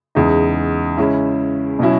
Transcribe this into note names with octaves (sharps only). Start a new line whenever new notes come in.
E2 C#3 G#3 D#4
C#3 G#3 C#4 E4
B2 F#3 C#4 E4